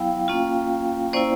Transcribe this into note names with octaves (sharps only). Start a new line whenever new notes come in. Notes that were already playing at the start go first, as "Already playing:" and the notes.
Already playing: F#3 B3 E4 F5 G5
A#3 C#4 F4
A#3 C#4 E4 C5 D5